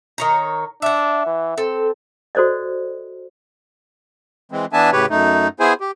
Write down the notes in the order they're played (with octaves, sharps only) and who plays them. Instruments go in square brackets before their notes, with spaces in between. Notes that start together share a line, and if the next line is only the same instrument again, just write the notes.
[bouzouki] D#3 C#5 A#5
[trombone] D4 [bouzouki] E5 F#5
[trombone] E3
[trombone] C4 [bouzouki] A4
[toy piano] F#4 A4 C5 D5 D#5
[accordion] E3 G#3 C4
E3 B3 D4 E5 G#5 A5
A2 C#3 G4 B4 C#5
F#2 A3 D#4
B3 E4 G#4 C5 G#5
G4